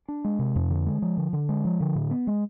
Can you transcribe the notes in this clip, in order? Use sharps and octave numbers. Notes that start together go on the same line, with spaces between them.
D4
G#3
C3
F2
D3
G#3
F3
D3
D3
G#3
F3
D3
A2
B3
G#3